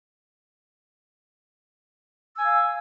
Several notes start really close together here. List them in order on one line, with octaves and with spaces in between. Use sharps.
E6 G#5 F5